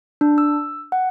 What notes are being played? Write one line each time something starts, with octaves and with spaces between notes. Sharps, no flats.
D4
E6
F#5